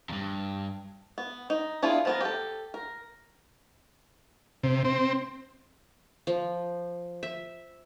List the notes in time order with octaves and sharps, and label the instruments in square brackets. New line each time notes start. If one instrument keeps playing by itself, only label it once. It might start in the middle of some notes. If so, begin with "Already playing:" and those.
[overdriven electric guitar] E2 G2
[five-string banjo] B3
D#4
B3 D4 E4 F4 G#4
F3 B3 A#4
G4 A4
A#4
[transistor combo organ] C3
C4
[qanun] F3
E5